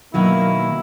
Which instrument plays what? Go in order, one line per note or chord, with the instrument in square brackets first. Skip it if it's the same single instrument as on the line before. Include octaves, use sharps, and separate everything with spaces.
[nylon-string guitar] B2 D#3 F#3 [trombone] A#3 [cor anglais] E4